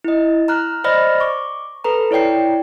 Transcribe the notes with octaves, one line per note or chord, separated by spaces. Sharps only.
E4 D#5
A#5 F6 F#6
C5 D5 D#5 B5 F6 A#6
C#6 D6
A4 B4 A#5
E4 C#5 D5 G5 C7